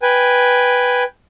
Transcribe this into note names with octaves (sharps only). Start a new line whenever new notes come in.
B4 G5 G#5